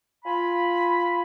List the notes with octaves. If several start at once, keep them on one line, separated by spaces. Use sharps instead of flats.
F4 G#5 B5